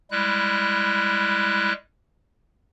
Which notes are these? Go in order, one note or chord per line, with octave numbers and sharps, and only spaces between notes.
G3 G#3 E4 F#6